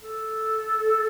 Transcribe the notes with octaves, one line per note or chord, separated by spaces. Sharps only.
A4